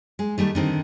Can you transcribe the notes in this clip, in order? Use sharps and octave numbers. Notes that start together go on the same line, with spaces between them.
G#3
D#3 G3 A3
D3 D#3 C4